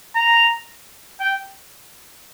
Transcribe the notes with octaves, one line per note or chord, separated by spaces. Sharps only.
A#5
G5